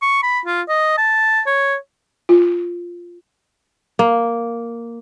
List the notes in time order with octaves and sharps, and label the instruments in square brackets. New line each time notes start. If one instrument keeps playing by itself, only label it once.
[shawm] C#6
B5
F4
D#5
A5
C#5
[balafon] F4
[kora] A#3